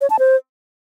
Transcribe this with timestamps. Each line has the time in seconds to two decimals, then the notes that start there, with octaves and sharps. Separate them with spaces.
0.01 C#5
0.10 A5
0.19 C5